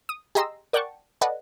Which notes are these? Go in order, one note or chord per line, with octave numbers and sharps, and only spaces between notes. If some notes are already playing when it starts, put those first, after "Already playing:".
D#6
G4 G#4 D#5 A#5 C6 E6
A#4 D5 F#5 G5 A5 C#6
A4 B4 D5 D#5 F#5